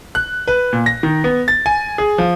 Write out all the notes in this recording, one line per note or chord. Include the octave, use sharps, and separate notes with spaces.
F#6
B4
A#2
A#6
D#3
B3
A6
G#5
G#4
F3